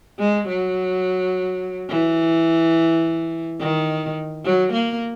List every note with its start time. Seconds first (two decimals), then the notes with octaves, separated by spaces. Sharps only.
0.19 G#3
0.48 F#3
1.89 E3
3.60 D#3
4.45 F#3
4.73 A#3